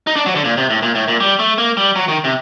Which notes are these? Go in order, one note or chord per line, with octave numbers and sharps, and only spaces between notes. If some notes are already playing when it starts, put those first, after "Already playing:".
D#4
D4
F#3
D3
A#2
C3
A2
A#2
A2
A#2
G3
A3
A#3
G3
F#3
D#3
C3